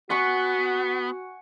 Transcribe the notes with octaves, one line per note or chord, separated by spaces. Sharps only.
B3 F#4 F#5 G#5 C#6